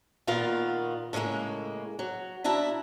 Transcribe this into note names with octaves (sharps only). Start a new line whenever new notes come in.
A#2 D#3 B3 F4 A#4 F5
A2 C#3 G3 G#3 A#3
F#3
B2 D4 E4 E5 A#5